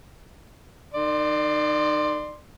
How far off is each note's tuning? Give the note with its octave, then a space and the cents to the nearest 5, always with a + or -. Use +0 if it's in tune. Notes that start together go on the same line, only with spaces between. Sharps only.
D#3 -30 D5 +25 C6 +0